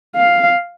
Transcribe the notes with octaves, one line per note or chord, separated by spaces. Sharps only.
F5